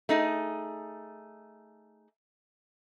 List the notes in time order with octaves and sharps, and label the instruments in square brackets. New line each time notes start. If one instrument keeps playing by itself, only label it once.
[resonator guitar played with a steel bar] A3 D#4 G#4